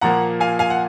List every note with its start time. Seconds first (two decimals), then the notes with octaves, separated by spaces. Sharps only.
0.01 A#2 F3 A#3 F#5 A#5
0.40 F5 G#5
0.59 F5 G#5
0.70 F#5